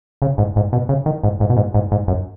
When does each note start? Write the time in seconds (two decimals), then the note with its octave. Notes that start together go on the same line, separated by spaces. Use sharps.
0.22 C#3
0.38 G#2
0.56 G#2
0.73 B2
0.89 C#3
1.06 D#3
1.23 G#2
1.40 G#2
1.50 B2
1.57 G#2
1.74 G#2
1.92 G#2
2.08 F#2